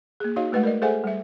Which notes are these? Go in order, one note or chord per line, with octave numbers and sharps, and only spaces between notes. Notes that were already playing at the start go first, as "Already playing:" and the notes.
A#3 G#4
D#4 F#4 C#5 D#5 F5
G#3 A3 B4 D#5 F#5
A#4 D5 D#5
G#4 A4 C5 E5 F#5 G#5
G3 E5